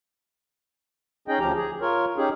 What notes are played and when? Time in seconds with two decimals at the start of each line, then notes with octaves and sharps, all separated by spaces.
1.28 C#4 D#4 G#4 D#5 G5
1.40 D2 F3 G4 A#5
1.55 G#4
1.81 F4 A#4 C#5
2.17 C#4 D#4 G4 G#4